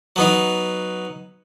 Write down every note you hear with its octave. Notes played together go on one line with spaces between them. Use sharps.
F#3 B3 D#4